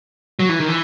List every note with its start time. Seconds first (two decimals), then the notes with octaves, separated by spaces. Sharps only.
0.39 F#3
0.49 E3
0.60 D#3
0.68 E3